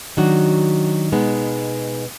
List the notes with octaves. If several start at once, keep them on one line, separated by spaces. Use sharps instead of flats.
D#3 F#3 D4 F#4
B2 G#3 B3 D#4